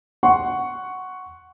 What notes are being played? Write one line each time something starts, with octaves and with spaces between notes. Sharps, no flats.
F#5 C6 C#6